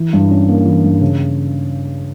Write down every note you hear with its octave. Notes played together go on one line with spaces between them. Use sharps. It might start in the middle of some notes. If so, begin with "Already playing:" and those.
Already playing: E3
G2
C#4
A#3
E3
G2
C#3